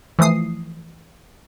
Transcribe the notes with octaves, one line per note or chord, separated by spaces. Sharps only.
E3 F3 A3 D#6 C7